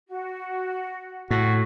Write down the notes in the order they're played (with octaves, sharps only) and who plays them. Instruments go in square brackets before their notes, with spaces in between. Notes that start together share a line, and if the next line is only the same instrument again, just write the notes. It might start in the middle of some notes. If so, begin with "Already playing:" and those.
[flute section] F#4
[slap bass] A2 [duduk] F#4